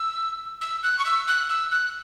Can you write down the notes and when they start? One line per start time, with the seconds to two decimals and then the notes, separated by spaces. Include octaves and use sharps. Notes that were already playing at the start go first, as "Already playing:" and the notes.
Already playing: E6
0.61 E6
0.83 F#6
0.99 C#6
1.06 E6
1.28 F#6
1.49 E6
1.71 F#6